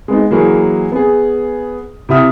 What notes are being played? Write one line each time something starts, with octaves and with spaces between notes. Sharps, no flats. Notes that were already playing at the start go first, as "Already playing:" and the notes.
G#3 B3 D#4
E3 F#3 A#3 E4 G#4 A#4
B3 G#4
C3 E4 G4 E5 D#6 F6